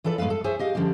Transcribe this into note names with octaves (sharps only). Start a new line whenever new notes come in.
E3 F4 A4 B4 D5
A2 G#3 B3 B4 F5
A4
G#4 C5 C#5 E5 G#5
G4 D#5 F5
D3 F3 C#4 G4